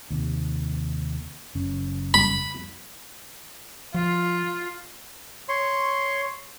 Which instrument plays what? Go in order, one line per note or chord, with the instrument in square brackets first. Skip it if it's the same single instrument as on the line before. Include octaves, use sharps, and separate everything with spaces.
[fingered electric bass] D#2 C3
F#1 C#4
[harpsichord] B5
[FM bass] F3 [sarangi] F4
[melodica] C#5 C6